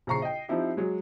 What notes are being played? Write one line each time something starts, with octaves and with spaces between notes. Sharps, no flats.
A#1 C#3 A#5 C#6 C7
D#5 G5
F3 C4 D#4 E4 G4
F#3 G#3